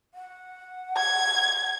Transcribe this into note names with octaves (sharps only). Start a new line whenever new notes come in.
F#5
G#6